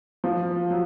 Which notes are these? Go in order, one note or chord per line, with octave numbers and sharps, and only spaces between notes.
F3
F#3